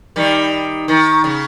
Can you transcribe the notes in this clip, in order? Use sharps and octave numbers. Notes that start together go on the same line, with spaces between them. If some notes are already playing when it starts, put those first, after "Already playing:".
D#3 G3
D#3
C#3